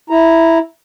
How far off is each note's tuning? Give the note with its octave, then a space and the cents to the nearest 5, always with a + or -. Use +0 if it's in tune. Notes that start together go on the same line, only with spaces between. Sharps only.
E4 +0 A#5 +0